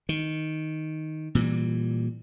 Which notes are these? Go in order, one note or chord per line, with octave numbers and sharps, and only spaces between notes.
D#3
A#2 E3 G3